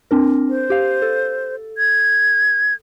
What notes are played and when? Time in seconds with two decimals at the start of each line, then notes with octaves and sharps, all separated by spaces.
0.11 C4 D4 A#4
0.49 C5
0.70 G4 F5
1.02 A4
1.78 G#6